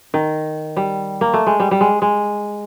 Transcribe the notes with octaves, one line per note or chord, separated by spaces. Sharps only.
D#3
G3
A#3
A3
G#3
G3
G3
G#3
G#3